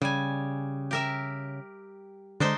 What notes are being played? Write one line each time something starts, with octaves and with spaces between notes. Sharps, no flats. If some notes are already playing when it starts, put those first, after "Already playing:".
C#3 G3 G#5
G4 A#4 E5
D3 G#3 D4 D#4 C5